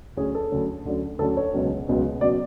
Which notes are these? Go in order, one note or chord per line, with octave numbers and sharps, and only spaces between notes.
D2 D3 F#3 C#4 G#4
A4
D2 D3 F#3 C#4
D2 D3 F#3 C#4
D2 D3 F#3 C#4 A4
C#5
C#2 B2 F#3 C#4
C#2 B2 F#3 C#4
B2 F#3 C#4 D5